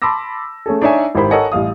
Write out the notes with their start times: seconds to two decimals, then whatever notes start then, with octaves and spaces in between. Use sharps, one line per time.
0.02 A5 B5 C6 D6 E6 A#6
0.66 A3 C#4 G#4 A4
0.82 D4 D#4 C#5 E5 G#5
1.15 G#1 E4 G4 A#4 C5 B5
1.31 A4 A#4 C#5 D#5 F#5 G#5
1.52 A1 G3 F5 D#6